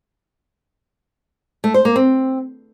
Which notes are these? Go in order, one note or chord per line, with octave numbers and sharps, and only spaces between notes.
A3
C5
A#3
C4